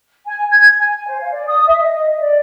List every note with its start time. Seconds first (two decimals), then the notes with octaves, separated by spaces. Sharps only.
0.25 G#5
0.51 G#6
0.79 G#5
1.07 C5
1.19 F5
1.31 D5
1.46 D#6
1.66 E5
1.81 D#5
2.18 D5